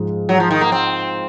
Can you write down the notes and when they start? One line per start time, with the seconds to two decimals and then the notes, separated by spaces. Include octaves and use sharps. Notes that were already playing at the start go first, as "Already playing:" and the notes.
Already playing: G#2 F3 G#3
0.29 F#3
0.40 F3
0.51 D#3
0.61 A#3
0.72 C4